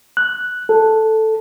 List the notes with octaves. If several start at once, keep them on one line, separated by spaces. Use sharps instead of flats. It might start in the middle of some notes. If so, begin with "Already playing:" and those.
F#6
A4